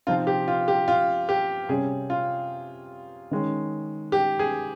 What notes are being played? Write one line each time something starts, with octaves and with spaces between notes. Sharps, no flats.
C3 F3 C4 D#4 F4
G4
F4
G4
F4
G4
C3 G3 C#4 G#4
F4
D#3 G#3 C#4
G4
G#4